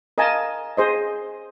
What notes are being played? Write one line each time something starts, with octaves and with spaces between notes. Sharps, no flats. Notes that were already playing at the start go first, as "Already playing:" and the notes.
A#4 D#5 F5 G#5 A5
G#4 C5 D#5